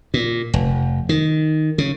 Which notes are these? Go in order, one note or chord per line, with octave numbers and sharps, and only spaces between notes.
A#2
F1
D#3
C#3